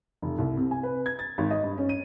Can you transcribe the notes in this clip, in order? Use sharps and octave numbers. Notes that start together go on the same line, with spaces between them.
F1
C2
C3
G#5
B4
G#6
A6
G#1
D#5
G2
C#4
D#7